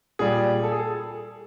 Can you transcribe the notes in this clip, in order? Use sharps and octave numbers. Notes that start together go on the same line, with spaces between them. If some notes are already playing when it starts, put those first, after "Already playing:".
A#2 G3 G#4
A4
G#4
A4